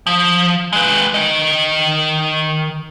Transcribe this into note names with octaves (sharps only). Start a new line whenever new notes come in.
F3
G#3 B4
D#3 D#5